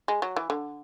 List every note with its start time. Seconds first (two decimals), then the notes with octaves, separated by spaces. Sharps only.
0.08 G#3
0.22 F#3
0.36 E3
0.50 D3